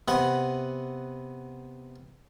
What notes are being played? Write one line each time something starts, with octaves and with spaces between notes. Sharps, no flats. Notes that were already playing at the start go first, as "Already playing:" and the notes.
C3 B3 F#5 B5